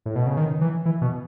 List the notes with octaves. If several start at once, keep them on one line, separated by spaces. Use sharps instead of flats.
A2
B2
C#3
D#3
E3
E3
B2